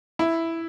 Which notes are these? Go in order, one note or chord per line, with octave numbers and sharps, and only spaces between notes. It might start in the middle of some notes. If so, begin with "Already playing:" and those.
E4